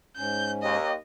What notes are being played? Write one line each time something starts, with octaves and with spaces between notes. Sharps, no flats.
G#2 C#4 G6
D#2 D#5